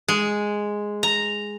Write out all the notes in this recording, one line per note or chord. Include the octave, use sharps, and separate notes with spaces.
G#3
A#5